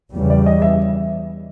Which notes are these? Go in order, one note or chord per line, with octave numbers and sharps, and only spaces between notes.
E2 C#3 E3 G3
D5
D#5
E5